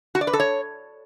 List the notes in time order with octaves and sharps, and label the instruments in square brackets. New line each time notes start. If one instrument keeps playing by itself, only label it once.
[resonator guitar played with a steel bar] F#4
D5
B4
A4
C#5